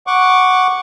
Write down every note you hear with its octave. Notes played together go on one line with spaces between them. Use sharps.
F#5 C#6 D6